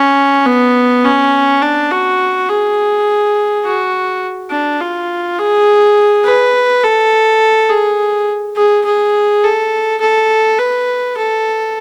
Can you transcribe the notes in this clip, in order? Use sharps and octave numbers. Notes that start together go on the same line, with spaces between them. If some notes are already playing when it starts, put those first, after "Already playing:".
Already playing: C#4
B3
C#4
D4
F#4
G#4
F#4
D4
F4
G#4
B4
A4
G#4
G#4
G#4
A4
A4
B4
A4